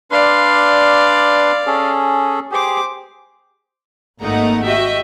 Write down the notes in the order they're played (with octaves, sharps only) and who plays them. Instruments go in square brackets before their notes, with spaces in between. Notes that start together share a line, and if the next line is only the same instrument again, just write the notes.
[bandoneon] D4 B4 C6 [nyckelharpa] D5 F5
[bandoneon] C#4 G#4 A4
[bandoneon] G4 G#4 [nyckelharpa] C5 D6
[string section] G#1 A3 A#3 D#4 F#5 A#5
F#4 G4 D#5 E5